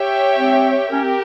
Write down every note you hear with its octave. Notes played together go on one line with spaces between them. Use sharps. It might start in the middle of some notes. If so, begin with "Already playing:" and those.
Already playing: G4 C#5 E5 G5
C4
C#4 G4 A#4
C4